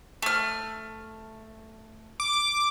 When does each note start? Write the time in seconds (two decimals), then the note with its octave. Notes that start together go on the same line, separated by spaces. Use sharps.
0.22 A3 F6
2.20 D6